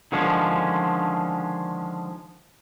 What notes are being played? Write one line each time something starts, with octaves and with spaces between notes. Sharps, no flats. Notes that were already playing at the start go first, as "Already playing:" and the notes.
D3 D#3 F3 G#3 C#4